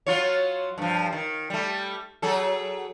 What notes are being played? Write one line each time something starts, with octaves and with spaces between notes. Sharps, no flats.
F#3 F4 C#5
G2 F3
D#3
G3 A3
F#3 G#4 A4